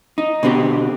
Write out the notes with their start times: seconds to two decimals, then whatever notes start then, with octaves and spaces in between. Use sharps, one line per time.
0.18 D#4
0.43 B2 D3 C4 G4